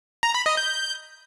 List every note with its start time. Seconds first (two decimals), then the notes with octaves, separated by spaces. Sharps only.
0.23 A#5
0.34 B5
0.46 D#5
0.57 G6